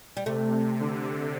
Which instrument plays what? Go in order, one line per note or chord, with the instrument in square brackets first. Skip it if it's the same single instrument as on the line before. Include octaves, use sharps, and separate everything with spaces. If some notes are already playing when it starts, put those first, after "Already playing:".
[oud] G3
[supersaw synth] C3 [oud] A3
[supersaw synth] D3